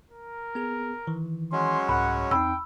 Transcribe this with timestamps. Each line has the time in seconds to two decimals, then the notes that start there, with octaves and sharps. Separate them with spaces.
0.10 A#4
0.55 B3 G#4
1.07 D#3 E3
1.52 F#3 G#3 C#4 C6
1.89 C2 G#2 F#5 B5
2.31 E2 C4 D#4 G5 B5 E6